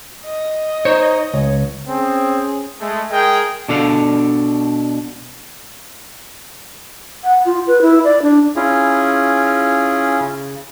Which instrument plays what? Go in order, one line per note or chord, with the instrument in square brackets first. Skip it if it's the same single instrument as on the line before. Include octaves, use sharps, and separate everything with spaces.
[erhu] D#5
[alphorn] D#4 [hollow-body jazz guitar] C5 C#5
[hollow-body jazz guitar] C#2 [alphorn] C#5
[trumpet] C4 [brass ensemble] C#4 G#4
[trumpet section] G#3 A3
G#3 G#4 A#4 D#5 G5
[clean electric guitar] B2 D4 A4 D5 F5
[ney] F#5
F4
B4
E4
D5
D4
[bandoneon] C#4 E4 F4 G#4
C#3